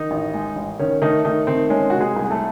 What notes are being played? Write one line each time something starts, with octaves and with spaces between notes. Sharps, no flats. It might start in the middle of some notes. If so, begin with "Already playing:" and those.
Already playing: D#3 D#4
A1
G#3
A1
D#3 C#4
D#3 A3 D#4
D#3 A3 D#4
D#3 C4
G#3 C#4
C3 F#4
G#3 G#4
C2
G#4
A3 A4